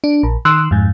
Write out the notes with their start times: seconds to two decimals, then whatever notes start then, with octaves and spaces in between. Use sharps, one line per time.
0.04 D4
0.23 A#1
0.45 D#3 C6 E6 F#6
0.71 F2 G#2